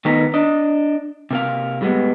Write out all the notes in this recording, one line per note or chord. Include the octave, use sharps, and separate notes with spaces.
D#3 A3 B3 D#4 A#4 B4
D4 D#5
C3 A#3 F5
A2 G3 G#3 B3